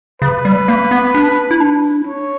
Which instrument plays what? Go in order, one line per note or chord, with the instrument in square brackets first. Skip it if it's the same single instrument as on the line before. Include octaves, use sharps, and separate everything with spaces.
[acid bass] C#3 [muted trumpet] B4
[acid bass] G3
A#3
B3
D4
E4
D4
[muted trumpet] C#5